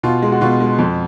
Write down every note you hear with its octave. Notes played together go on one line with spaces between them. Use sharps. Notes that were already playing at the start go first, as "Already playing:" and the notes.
B2 F4
G#3
F#4
B2 F4
G#3
F2